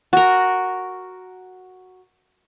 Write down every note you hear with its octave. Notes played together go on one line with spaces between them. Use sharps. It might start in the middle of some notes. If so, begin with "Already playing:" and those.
F#4 A#4